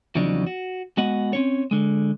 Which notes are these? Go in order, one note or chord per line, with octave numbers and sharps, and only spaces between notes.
E2 C#3 F3 F#3 D4 D#4
F#4
G#3 B3 F#4 D#5 F#5
C4 C#4 C#5
D3 G#3